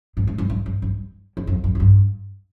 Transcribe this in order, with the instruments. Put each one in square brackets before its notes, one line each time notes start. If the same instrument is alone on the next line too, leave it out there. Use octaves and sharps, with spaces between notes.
[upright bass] G#2
G#2
G2
G2
G2
G2
E2
F2
F2
F#2
G2